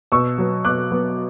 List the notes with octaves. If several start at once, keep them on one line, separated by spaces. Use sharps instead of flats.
B2 C#6 E6
F#3 B3
B2 D6 F#6
F#3 B3